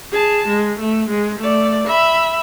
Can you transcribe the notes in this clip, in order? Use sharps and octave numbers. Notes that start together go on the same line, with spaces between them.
G#4 A5
G#3
A3
G#3
A3 D5
E5 B5